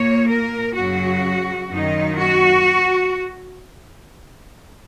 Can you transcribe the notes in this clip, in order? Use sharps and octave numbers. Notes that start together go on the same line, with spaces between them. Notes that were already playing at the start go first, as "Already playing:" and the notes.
Already playing: A#2 A#3 C#5
A#4
F#2 C#3 F#3 F#4
F#2 D#3 A#3 D#4
F#4